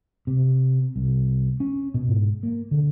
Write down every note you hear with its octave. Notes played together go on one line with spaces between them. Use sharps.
C3
C2
C#4
B2
G#2
A#3
D3